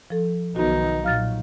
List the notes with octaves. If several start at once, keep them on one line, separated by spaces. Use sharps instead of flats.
F3 A4
B1 D#3 B3 D#4 F#4
A#2 F#3 F5 F6 A6